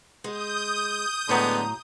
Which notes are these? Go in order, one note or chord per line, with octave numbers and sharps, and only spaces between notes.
G#3 D#6 G6
A2 D3 F#3 G#3 B3 A#5